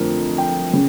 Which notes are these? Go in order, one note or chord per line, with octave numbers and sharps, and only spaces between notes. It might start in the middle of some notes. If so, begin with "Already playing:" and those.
Already playing: F2 D3 F3 A3 A#4
G5
C#3